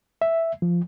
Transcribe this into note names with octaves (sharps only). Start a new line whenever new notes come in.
E5
F3